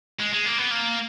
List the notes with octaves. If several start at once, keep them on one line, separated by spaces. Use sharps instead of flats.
G#3
G#3
A#3
B3
A#3